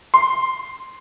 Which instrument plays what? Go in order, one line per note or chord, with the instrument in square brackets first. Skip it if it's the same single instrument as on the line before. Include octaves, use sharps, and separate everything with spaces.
[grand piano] C6